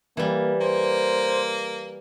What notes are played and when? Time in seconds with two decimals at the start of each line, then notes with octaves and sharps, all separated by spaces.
0.17 E3 G3 A#3
0.61 A#3 C5